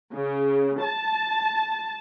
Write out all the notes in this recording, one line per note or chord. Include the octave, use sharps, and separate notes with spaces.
C#3
A5